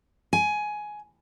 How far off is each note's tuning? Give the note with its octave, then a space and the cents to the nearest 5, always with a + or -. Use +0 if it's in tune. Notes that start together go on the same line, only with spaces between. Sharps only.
G#5 +15